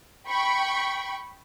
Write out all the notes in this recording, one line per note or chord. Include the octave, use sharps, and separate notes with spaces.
G5 B5 C#6